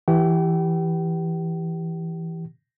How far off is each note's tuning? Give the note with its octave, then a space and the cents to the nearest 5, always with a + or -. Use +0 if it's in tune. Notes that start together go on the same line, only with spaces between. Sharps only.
E3 +0 G4 +0 G5 -40